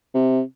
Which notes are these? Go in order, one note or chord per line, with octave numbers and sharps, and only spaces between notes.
C3